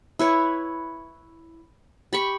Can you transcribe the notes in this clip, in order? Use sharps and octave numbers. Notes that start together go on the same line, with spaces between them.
E4 B4 C#5
G4 B5 C#6